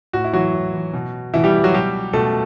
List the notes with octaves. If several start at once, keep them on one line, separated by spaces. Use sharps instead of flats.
A2 F#4
E4
E3 F#3 F#4
A2
E3
B2
B2 E3 E4
G3 G4
F#3 F#4
B2 G3 G4
B2 A3 A4